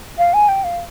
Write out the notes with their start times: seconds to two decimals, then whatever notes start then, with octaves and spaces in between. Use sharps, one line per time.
0.18 F5
0.34 G#5
0.48 G5
0.64 F5